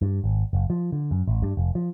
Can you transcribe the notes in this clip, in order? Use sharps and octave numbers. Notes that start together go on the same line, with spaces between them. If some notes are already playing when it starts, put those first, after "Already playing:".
G2
G#1
F#1
F3
D3
F#2
A1
G2
F1
F3